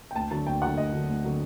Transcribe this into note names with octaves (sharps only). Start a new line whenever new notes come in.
G5
D2 A5
D3 F#3 A5
D2 G5
D3 F#3 F#5
D2 D#5
D3 F#3
D2
D3 F#3